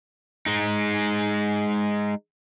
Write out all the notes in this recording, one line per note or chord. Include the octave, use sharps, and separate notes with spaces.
G#3 D#4